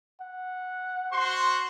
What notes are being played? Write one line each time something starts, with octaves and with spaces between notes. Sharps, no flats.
F#5
F#4 C5 C6